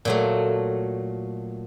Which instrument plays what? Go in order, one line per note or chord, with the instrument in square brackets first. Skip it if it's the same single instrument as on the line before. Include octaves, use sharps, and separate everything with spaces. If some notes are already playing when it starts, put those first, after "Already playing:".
[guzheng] A#2 F#3 A3